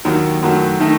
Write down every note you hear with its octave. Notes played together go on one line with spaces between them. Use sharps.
D#2 D#3 F#3
F#2 D#3 F#3 A3
D#3 A3 D#4